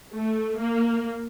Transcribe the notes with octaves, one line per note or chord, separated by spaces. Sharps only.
A3
A#3